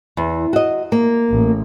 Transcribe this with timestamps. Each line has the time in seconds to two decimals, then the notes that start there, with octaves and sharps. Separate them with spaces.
0.17 E2
0.53 F#4 D#5
0.92 A#3
1.30 A1